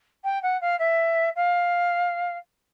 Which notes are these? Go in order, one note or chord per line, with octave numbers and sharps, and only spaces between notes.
G5
F#5
F5
E5
F5